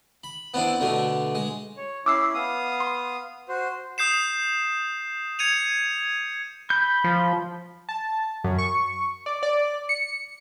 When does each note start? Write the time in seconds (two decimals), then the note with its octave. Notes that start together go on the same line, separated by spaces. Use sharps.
0.24 B5
0.54 B3 C4 D4 E4
0.80 B2 D3 A3
1.35 G#3
1.77 C#5
2.06 C#4 E4 D6 E6 C7
2.34 B3 F5 D#6
2.80 C6
3.49 F#4 C5
3.98 D#6 G6 C7 E7
5.39 G#6 C#7 D#7 F7
6.70 B5 G6
7.04 F3
7.89 A5
8.44 F#2
8.58 C#6
9.26 D5
9.43 D5
9.89 C#7